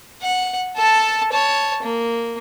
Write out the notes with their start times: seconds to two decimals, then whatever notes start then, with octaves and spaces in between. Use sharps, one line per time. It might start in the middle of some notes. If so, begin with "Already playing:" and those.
0.22 F#5
0.77 A4 A5
1.33 C#5 A5
1.83 A#3